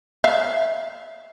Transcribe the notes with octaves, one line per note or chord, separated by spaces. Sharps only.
E5 F5